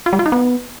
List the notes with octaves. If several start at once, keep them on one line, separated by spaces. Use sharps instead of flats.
F4
G3
F4
D#4
B3